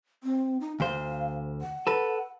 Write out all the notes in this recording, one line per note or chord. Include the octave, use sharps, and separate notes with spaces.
C4
D#4
D2 C5 F5
F#5
A4 B4